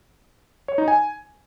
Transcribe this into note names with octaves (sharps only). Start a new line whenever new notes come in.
C#5
D#4
G#5